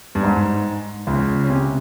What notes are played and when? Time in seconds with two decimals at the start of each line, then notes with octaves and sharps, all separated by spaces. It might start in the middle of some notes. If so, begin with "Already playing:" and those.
0.15 G2
0.23 G#2
1.07 C#2 C#3
1.44 C#4
1.49 C3 C4